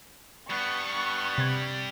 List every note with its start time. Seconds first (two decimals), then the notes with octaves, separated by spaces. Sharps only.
0.50 G3 B3 D4 C#6
0.93 B3
1.38 C3 G#6